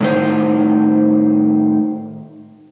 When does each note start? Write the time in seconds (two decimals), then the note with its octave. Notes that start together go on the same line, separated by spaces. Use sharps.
0.01 A2 D#3 C5